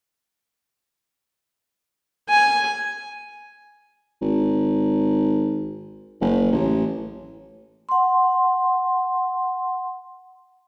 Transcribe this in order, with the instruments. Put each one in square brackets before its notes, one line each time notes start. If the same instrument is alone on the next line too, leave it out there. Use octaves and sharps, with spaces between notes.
[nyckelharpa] G#5
[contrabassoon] G#1
F#1
A1
[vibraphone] F#5 C6